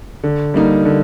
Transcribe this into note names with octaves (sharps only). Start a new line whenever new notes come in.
D3
G3 A#3 D#4
D3